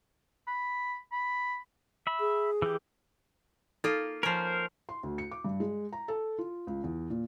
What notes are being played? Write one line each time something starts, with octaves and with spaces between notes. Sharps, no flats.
B5
B5
E5 B5
G#4
E3 G4
A#3 D#4 F4 A4
F3 C#4 A#4 C5
C6
D2
C#7
D6
G2
G#3
A#5
A4
F4
C#2
E2
A#2